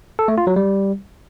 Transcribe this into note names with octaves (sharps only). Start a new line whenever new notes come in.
A4
A3
F4
F#3
G3